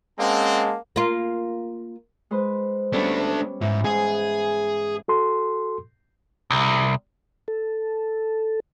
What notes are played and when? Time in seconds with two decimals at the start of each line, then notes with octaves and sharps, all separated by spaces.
0.19 G#3 A#3 C4 C#4 F#5 A5
0.96 A#3 F4
2.31 G#3 B4 C5
2.93 G3 A3 B3 C#4 D4
3.61 G#2 E3
3.84 G#2 E3 G#4
5.08 F#4 A4 C6
6.51 C2
7.48 A4